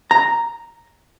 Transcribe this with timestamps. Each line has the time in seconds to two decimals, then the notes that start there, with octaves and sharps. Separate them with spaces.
0.11 A#5